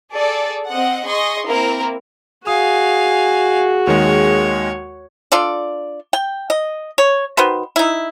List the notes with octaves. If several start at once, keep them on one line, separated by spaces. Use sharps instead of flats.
G#4 A4 D5
C4 D#5 F#5
G#4 D#5 C6 C#6
A#3 C4 E4 A#4
F#4 G#4 F5 G#5 D#6
D#2 D#3 G#3 C#5
D4 F4 A4 D5
G5
D#5
C#5
D#3 F#4 B4 C5
D#4 E4